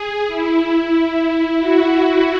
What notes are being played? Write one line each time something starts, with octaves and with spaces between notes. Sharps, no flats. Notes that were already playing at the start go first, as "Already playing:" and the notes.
Already playing: G#4
E4
E4
F#4